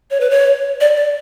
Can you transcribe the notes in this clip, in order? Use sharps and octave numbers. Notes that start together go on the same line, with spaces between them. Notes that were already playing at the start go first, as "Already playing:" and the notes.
C#5
B4
C#5
D5
D5